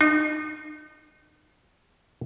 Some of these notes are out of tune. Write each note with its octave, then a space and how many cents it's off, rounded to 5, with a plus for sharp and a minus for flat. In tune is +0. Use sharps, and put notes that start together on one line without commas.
D#4 -30